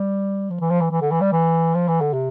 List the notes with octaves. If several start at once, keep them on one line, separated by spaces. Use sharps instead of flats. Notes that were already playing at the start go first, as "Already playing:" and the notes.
Already playing: G3
F3
E3
F3
E3
E3
D3
E3
G3
E3
F3
E3
D3
C3